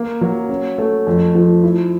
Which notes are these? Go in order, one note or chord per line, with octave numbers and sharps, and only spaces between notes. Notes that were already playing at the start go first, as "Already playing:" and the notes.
Already playing: A#3
F#3
C#4
A3
F2
F3
E4